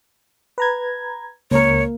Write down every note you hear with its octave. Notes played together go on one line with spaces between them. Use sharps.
B4 A#5 G#6
C#2 A#3 A#4 C#5